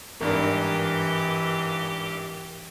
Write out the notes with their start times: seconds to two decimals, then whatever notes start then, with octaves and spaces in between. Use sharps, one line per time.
0.21 G#1 G2 E3 G4 A#4